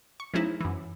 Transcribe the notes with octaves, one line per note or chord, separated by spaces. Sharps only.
C#6
F3 G#3 C#4 D#4 E4
F#2 E3